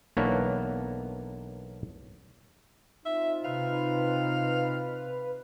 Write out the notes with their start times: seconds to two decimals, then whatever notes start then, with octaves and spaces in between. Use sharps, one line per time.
0.17 B1 E3 A#3 B3 D4 C#5
3.05 C4 D#4 F4 E5
3.45 C3 B4 F5